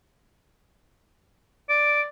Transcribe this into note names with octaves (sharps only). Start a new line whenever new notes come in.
D5 D7